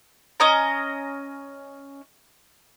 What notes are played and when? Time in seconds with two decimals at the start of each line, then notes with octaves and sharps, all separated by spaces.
0.40 C#4 D#5 A#5